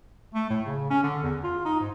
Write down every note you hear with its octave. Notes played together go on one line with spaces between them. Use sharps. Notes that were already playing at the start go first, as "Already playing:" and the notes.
A3
A2
C#3
C#4
D3
E2
F4
D#4
G#2